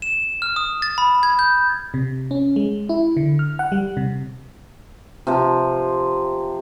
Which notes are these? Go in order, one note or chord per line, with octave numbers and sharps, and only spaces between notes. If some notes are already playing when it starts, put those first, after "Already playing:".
E7
F6
D#6
A6
B5
G#6
G6
C3
C#4
G#3
E4
D3
F6
F#5
G3
C3
C3 F3